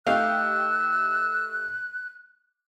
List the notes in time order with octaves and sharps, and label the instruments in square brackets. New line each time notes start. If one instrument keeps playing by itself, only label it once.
[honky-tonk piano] A3 D#4 G4 [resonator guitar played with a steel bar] F5 [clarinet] E6 [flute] F#6